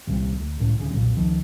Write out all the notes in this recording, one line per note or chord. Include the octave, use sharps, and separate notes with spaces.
D#1 C2 G3
D2
D#1 C#2 A2
D#1 D2 C#3
B1 F2 A#2
C#2 D#3 F3